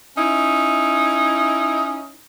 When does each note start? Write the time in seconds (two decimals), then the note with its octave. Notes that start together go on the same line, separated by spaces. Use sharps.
0.17 C#4 D#4 E4